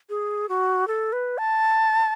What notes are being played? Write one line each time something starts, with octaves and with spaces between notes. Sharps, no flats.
G#4
F#4
A4
B4
A5